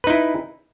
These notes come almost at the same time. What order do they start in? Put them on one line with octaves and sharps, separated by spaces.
B4 D#4 E4